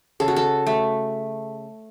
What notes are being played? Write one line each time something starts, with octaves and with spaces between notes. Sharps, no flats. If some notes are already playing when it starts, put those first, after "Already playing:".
C#3 A4
F#4
A4
A3